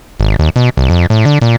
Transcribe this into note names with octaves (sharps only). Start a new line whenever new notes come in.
G#1
D#2
B2
C2
F2
A2
D3
A#2